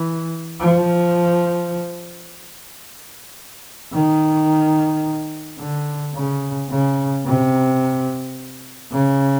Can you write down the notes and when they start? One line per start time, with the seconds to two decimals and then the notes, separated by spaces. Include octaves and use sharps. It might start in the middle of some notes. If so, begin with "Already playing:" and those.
Already playing: E3
0.60 F3
3.93 D#3
5.59 D3
6.15 C#3
6.69 C#3
7.25 C3
8.92 C#3